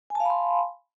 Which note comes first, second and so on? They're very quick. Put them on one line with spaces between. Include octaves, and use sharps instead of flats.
G#5 A5 F5 B5 C6